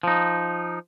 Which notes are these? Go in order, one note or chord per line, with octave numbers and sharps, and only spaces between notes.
F3 D#4